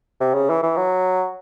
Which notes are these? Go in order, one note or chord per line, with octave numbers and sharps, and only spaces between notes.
C3
C#3
E3
E3
F#3